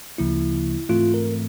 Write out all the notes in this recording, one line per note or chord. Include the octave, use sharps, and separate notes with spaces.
D2 C#3 F3 A#3 E4
G#2 E3 A3 C4 F4
A#4